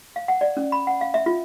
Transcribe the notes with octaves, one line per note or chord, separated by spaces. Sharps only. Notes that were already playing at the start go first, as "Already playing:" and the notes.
F5
F#5
D5
C#4
B5
F#5
F5
E5
F4